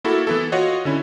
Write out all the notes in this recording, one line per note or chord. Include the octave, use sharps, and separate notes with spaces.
A#3 E4 F#4 A4
E3 B3 E4 A4
F4 F#4 C#5 D#5 F#5
D3 C#4 E4